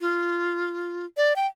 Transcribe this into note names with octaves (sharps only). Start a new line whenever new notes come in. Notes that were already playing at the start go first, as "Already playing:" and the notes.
F4
D5
G5